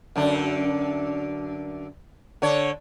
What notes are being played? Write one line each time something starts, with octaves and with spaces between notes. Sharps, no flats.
F#2 D3 D4
D3 D4 C#5